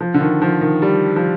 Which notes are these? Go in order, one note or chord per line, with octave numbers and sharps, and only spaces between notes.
F3
D3
D#3
F3
D#3
G3
F3